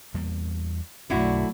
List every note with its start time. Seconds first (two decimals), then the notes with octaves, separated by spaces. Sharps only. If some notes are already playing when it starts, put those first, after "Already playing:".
0.14 E2 G3 A#3
1.10 B1 F#2 B2 D3 F#3 A3 E4 F#4